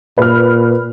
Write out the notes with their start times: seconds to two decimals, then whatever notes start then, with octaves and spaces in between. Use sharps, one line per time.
0.18 A#2 B4 F6